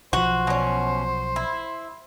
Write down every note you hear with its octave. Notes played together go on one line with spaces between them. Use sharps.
B1 F3 F#4 C5
B2 C#4
E4